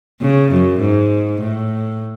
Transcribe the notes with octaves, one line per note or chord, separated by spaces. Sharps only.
C#3
F#2
G#2
A2